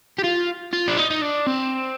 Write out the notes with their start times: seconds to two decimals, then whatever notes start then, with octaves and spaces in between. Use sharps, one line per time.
0.18 G4
0.24 F4
0.73 F4
0.88 D4
0.97 D#4
1.10 D#4
1.22 D4
1.47 C4